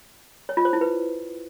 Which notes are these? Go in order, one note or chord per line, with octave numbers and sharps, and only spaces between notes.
C#5
F4
C5
E4
B4